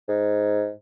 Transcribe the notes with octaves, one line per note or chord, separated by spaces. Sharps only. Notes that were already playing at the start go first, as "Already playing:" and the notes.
G#2